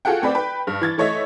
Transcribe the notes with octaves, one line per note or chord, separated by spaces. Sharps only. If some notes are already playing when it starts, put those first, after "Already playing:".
F4 F#4 G#4 A4 F#5 G5
A3 C4 B4 D5 G5
B4 G5
G2
E3 G#6 A6
E3 A3 C#5 D#5 E5